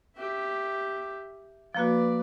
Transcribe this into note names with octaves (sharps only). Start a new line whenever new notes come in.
G4 E5
F3 A#3 F#4 B4 D5